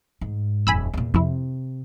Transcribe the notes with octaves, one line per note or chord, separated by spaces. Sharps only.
G#2
D#1 F2 G#5 B5 E6
E2 A#2
F2 C3 E4